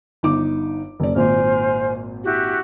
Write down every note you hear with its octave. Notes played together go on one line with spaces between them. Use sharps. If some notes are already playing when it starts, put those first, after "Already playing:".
G1 D#4 D6
F#1 D5
G#1 A#2 C5 G#5 F6
E4 F#4 G4